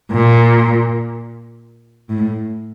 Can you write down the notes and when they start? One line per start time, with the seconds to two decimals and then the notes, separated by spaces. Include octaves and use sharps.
0.12 A#2
2.10 A2